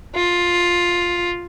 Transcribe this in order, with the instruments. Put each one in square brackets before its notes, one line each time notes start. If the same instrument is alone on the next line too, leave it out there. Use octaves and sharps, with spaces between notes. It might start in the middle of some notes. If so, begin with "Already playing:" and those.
[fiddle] F4